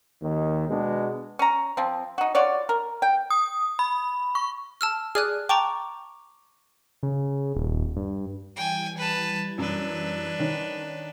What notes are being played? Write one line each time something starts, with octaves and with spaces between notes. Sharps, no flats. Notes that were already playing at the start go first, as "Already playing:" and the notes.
D#2 D#3
B2 G#3 D4
C#4 A#5
F3 C4
D#4 F#4
F4 F#4 C#5 D5
A#4
G5
D#6
B5
C#6
A5 E6 F6
G#4 D5 D#6 F6 F#6
G5 A5 A#5 C#6 D6
C#3
D#1
G2
E3 G3 G5 G#5 G#6
B4 A5
F#2 D4 B4
D#3 C#4 D#4